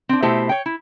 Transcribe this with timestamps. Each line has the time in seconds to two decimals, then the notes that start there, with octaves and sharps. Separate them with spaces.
0.09 C4 D4
0.22 B2 A3 E4 G4 C5 E5
0.49 C#5 G5
0.66 E4